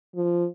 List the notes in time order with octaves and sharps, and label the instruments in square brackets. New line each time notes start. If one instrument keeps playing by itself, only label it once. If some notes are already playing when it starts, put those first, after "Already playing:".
[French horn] F3